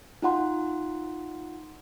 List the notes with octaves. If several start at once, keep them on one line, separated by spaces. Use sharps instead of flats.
D#4 F4 F#5 C6